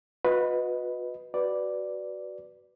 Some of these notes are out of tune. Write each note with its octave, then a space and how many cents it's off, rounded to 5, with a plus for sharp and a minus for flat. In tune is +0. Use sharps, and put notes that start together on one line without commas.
F#4 -40 B4 +0 D#5 +0
F#4 +20 B4 +0 D5 +0